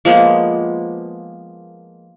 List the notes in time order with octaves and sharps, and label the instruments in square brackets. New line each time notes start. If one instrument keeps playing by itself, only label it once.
[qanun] F3 G#3 A#3 B3